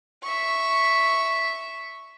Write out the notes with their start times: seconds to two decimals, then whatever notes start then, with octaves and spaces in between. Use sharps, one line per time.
0.23 E5 C#6